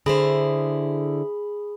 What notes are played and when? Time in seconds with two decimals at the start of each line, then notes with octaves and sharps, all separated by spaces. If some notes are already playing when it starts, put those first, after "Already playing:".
0.06 D3 E4 G#4 C5 B5